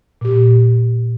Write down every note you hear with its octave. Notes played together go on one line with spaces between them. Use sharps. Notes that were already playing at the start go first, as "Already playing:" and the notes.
A#2 G4